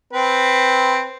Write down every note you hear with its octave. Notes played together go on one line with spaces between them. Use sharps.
C4 B4